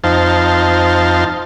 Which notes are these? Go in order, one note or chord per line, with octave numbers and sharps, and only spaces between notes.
F2 D#4 C5 F5 A5